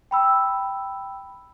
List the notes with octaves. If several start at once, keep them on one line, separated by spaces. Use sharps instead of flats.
G5 B5 E6